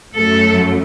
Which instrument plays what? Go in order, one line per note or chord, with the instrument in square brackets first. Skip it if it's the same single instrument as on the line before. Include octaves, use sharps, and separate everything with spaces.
[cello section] F#2 F#3 A3 A4